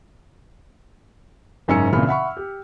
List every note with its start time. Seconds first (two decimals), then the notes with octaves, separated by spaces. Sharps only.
1.68 F#1 G#2 C#4 G#5 E6 C#7
1.93 G#1 A#2 C#3 E3 B5 F6
2.07 E5 F#5 B5 C#6
2.37 G4